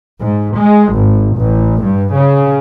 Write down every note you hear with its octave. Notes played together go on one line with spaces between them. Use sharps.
G#2
G#3
G#1
A1
G2
C#3